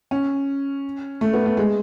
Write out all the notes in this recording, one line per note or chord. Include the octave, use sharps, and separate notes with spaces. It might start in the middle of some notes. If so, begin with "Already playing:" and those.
C#4
A3
B3
A3
G#3